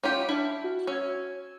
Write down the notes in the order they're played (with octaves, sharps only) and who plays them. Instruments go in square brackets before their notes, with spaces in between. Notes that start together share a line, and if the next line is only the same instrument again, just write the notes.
[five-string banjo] C#4 F4 G4
[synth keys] D4 F6 [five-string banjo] E4 A5
[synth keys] F#4
[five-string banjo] C#4 [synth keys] E6 G#6